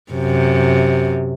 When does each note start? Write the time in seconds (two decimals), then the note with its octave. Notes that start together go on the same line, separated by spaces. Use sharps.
0.12 F#2 C3